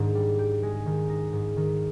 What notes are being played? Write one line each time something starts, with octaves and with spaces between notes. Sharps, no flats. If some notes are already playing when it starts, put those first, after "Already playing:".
Already playing: G#2 D#3 D4
G3
G4
G#3
D#3
D#4
G#2
D#3